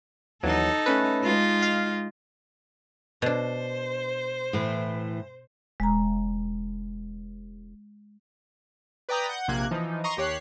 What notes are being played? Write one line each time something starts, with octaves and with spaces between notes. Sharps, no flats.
D#2 E3 F#3 D#4 A4
A3 C#4 B4
G#3 D#4 F4
F5
B2 D4 C5
A2 E3
E1 G#3 A#5
B4 D5 G5 A#5 D#6 G6
F#5 G6
A#1 C3 A#3 F#6 G#6
E3 F3 D#4
D#5 A#5 C6 C#6
D#2 G4 C#5 F#6 C7